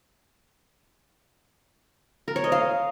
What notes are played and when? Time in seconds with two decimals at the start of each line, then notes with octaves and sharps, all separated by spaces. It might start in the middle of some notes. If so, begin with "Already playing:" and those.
2.28 A#4
2.36 C#5
2.44 D#5
2.52 F5